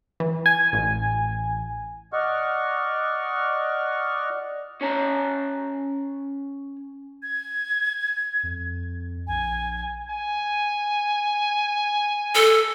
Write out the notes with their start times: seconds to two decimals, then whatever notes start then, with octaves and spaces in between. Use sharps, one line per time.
0.20 E3
0.46 G#5
0.73 A1
2.13 D5 D#5 F#5 C#6 F6
4.81 C#4 C#5 A5 A#5
7.23 G#6
8.43 F2
9.27 A#1 G#5
10.10 G#5
12.35 A4